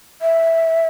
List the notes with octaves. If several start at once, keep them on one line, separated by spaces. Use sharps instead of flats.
E5